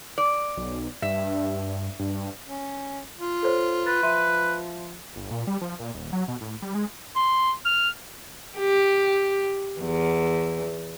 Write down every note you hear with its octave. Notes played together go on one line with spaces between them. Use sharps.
D5
B1
G2 E5
G2
C#4
F4
A4 C5 C#5
B4 A6
F3 E5 C6 D#7
G1
A#2
G3
F3
A#2
D#1
F#3
B2
A2
G3
G#3
C6
F6
G4
E2